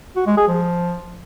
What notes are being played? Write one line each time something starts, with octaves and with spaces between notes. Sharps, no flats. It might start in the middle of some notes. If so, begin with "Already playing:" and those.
F#4
G#3
G#4
F3